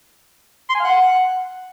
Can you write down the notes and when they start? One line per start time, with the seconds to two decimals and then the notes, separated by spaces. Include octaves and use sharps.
0.70 C6
0.75 G#5
0.80 F5
0.85 F#5